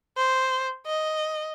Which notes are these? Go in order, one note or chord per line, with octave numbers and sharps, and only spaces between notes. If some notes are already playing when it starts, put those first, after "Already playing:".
C5
D#5